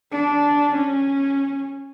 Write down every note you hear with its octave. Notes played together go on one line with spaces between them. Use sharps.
D4
C#4